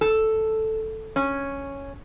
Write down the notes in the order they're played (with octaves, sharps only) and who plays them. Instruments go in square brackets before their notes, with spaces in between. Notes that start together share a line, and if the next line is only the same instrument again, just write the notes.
[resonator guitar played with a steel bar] A4
C#4